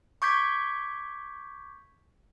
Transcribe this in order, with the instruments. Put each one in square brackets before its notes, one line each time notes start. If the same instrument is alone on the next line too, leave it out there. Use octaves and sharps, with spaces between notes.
[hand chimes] C#6 D6 G6 G#6 B6